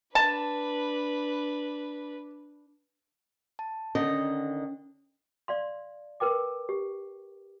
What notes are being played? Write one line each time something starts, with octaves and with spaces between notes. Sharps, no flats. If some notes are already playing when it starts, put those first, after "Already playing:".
D4 B4 A5
A5
D3 D#3 C#4 D#5
D5 F5 C6
A#4 B4 G5 D6
G4